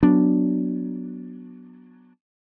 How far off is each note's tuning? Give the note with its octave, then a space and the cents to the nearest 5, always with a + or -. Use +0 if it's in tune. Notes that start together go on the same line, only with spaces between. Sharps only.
F#3 +0 B3 +0 D4 +0